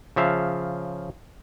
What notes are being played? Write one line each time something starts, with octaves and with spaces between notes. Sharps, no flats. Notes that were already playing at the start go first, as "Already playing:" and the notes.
C#3 F3 E5 F5